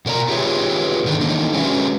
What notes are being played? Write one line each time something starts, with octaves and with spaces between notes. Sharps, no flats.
B2 A#4 D5 A#5
F4 G4 G#4 B4 C#5 E5
G#2 D3 D#3 D4
D#3 E3 A#3 D4 D#4
G#3 C#4 F#4 G#4 B4 E5